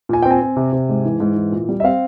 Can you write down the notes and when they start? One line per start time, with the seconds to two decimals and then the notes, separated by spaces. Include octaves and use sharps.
0.09 A#2 G#5
0.22 C4 G5
0.31 G#5
0.41 C4
0.57 C3
0.73 C3
0.89 G#2
1.05 E3
1.20 G#2
1.36 E3
1.52 A#2
1.69 G3
1.80 E5
1.84 C4 F5